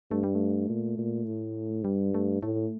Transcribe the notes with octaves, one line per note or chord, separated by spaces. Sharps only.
G2 A3
G3
A3
A#2
A#2
A2
G2 G3
A3
A2 A3